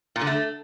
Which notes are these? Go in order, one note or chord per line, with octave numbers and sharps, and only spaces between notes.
A#2
D3
A3